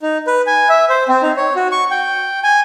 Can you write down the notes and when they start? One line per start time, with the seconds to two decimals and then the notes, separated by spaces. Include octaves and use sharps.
0.02 D#4
0.27 B4
0.47 G#5
0.69 E5
0.90 C5
1.08 C4
1.22 D#4
1.37 C#5
1.56 F#4
1.72 C#6
1.91 G5
2.44 G#5